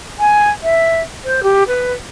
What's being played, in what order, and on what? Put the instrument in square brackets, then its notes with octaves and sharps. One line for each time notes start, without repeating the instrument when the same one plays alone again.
[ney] G#5
E5
C5
G4
B4